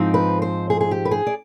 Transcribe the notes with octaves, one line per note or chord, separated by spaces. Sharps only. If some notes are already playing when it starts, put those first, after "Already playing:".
Already playing: G#2 F3 C4 D#4
B4
C5
G#4
G#4
G4
B4
G#4
D5